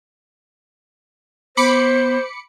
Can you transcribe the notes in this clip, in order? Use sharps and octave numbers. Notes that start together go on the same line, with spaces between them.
B3 C5 B5 D6 C#7